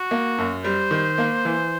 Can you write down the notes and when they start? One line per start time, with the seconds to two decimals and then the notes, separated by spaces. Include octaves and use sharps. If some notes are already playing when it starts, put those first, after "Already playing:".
Already playing: F#4
0.11 A#3
0.38 F#2
0.64 G3 C5
0.91 D#3
1.18 A#3
1.45 E3